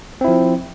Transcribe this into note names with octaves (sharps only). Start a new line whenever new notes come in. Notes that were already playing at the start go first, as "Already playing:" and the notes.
F3 C4 E4